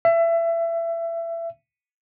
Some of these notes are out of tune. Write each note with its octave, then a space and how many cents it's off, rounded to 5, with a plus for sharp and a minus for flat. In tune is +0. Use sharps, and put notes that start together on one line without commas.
E5 +25